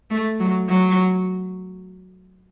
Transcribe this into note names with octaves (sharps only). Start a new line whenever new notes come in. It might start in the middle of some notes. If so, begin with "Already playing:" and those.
A3
F#3
F#3